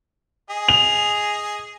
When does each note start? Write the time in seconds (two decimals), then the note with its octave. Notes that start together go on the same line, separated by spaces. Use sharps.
0.50 G#4 D#5
0.68 F7